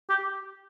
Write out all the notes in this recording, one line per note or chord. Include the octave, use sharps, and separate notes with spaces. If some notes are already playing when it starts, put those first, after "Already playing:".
G4